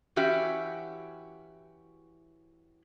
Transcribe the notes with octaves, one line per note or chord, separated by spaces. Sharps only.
E3 C#4 F#4 G4 E5